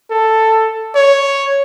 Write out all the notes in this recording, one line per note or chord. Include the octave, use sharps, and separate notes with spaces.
A4
C#5